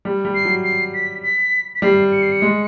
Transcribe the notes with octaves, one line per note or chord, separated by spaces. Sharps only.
G3
G3
C7
F#3
C7
B6
B6
B6
G3 C7
C#7
C7
C#7
G#3